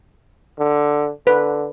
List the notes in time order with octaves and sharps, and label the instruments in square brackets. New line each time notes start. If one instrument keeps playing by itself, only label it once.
[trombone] D3
[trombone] D3 [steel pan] B4